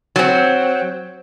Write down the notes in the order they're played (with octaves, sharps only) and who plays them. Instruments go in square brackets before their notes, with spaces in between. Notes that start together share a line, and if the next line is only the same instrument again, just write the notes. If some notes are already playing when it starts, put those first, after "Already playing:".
[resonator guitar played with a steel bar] F#3 C4